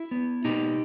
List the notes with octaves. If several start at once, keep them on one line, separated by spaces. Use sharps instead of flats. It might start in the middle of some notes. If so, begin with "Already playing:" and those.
Already playing: E4
B3
B2 D#4 G4